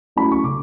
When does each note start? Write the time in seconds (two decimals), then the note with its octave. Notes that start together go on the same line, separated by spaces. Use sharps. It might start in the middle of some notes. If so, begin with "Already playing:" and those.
0.16 F#3 A3 C#4 E4 B5
0.32 C#6
0.43 C#3 D6